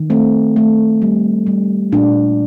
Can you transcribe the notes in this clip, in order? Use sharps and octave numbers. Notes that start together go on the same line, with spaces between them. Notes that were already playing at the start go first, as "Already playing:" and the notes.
Already playing: D#3
A3 C4
A3
G3
G3
A#2 D4